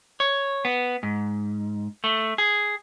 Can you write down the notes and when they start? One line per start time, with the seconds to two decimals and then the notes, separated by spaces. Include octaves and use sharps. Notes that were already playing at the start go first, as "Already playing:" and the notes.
0.20 C#5
0.65 B3
1.03 G#2
2.04 A3
2.38 G#4